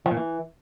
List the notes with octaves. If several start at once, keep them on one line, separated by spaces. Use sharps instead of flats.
F3
A#2
E3